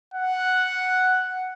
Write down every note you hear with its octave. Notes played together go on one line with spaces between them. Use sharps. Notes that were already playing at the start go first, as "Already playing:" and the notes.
F#5